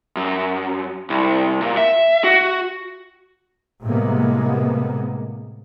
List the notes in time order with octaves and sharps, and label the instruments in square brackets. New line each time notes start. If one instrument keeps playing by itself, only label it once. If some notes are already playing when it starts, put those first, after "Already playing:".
[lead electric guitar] F#2
C2
A#2
E5
F#4
[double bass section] A2 C3 G3 G#3 A#3 B3